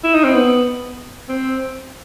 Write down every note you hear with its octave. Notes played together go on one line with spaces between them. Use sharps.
E4
D#4
C4
B3
C4